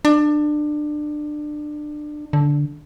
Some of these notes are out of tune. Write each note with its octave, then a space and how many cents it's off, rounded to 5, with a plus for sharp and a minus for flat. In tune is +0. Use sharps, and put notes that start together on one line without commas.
D4 +25
D3 -10